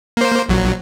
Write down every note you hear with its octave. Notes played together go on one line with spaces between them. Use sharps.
A#3 C5
A#1 F#3